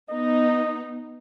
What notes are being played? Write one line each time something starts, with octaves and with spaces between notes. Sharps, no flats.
B3 D#4 D#5